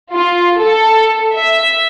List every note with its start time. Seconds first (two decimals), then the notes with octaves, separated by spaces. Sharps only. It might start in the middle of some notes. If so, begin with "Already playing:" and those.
0.10 F4
0.58 A4
1.34 E5